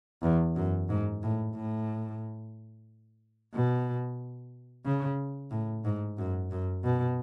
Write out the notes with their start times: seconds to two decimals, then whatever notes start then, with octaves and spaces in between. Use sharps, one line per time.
0.23 E2
0.56 F#2
0.89 G#2
1.23 A2
1.55 A2
3.54 B2
4.85 C#3
5.51 A2
5.85 G#2
6.18 F#2
6.51 F#2
6.84 B2